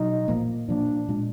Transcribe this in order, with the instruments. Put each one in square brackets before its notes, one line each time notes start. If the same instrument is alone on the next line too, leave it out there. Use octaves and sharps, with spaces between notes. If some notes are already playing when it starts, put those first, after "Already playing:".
Already playing: [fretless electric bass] B2 F#3 [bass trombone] D#4
[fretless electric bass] A#2 F3 A#3
[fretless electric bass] A#2 F3 A#3 [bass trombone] D4
[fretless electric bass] A#2 G#3 D4